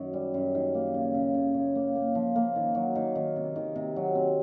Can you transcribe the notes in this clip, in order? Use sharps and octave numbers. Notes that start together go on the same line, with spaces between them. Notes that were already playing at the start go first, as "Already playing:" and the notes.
Already playing: F#2 D#3
G3
F#2
D#3
A#3
C#3
C#3
C#3
C#3
A#3
A#3
F3
A#3
D#3
F#3
D#3
D#3
C3
D#3
C3
F#3
C4